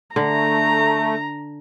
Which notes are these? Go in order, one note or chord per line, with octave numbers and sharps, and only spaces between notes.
D3 A3 A#5